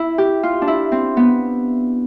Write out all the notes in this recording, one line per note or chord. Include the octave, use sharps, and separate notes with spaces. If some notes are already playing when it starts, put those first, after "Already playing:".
Already playing: E4
G4
F4
D4
E4
C4
B3